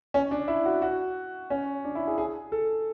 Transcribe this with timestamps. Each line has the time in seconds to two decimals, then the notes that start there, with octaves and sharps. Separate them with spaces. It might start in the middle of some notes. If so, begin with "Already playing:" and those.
0.14 C#4
0.31 D4
0.48 E4
0.65 F#4
0.82 F#4
1.50 C#4
1.84 D4
1.95 E4
2.07 G#4
2.18 G#4
2.52 A4